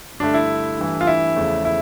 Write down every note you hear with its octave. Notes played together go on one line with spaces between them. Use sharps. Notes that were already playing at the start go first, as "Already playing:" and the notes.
G2 D3 A3 D4
E4
G2 E3 A3
F4
E4
E2 C#3 F3 A3
E4